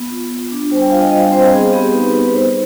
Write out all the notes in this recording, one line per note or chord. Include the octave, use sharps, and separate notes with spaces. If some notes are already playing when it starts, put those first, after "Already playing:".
Already playing: B3
F4
B3
D4
G3 C5 G#5
G5
F4 F5
D#5
G3 D#5
C4 C5
B3 G#4
G#4
B3 G4
D#4 B4
D#4 B4
G3 C5